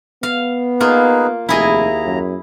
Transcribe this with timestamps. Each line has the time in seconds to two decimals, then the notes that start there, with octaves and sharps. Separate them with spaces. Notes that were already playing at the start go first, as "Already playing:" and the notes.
0.23 B3 F5
0.80 A#3 D#4 F4 G#4 B4
1.49 F1 D#2 E4 G#4 D#5 A#5
2.06 F#2